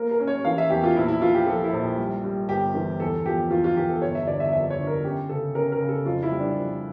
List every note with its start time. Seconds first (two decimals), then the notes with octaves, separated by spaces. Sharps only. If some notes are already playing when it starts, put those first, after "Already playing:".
Already playing: A#3 A#4
0.11 A#4
0.20 C#4
0.27 C#5
0.45 E3 F5
0.58 E5
0.70 E2 G4
0.83 F4
0.95 A#1 E4
1.08 E4
1.21 F3 F4
1.34 G4
1.46 F3 A4
1.64 E4
1.73 A#1
1.98 G3
2.24 G3
2.49 G1 G4
2.75 E3
3.00 E2 A4
3.25 F3 G4
3.51 E2 F4
3.64 F4
3.76 E2 G4
3.89 A4
4.02 G1 C#5
4.15 E5
4.27 D3 D5
4.40 E5
4.53 F2 E5
4.70 C#5
4.79 D3
4.87 A#4
5.04 C#4 G4
5.29 C#3 A4
5.55 C#4 A#4
5.72 A#4
5.81 C#3
5.89 A4
6.06 F2 F4
6.23 E4
6.31 G3
6.40 D4
6.57 F2